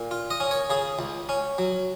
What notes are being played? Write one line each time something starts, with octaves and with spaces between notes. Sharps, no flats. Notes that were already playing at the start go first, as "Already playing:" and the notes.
Already playing: A#2
F4
D#5
C#4
C#5
C#3 G#4
C#2
C#4
F#3